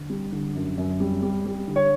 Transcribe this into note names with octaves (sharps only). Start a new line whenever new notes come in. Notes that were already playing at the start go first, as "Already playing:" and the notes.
Already playing: D3
G3
D3
F#2
F#2
G3
G3
G3
D3
C#5